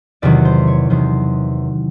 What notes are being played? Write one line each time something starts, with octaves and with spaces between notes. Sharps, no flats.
E2 C3 D#3 F#3 D5
C5
C#5
E2 C3 D#3 F#3 C5